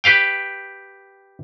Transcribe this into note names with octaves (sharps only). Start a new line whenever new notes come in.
G4 B4 F5 G5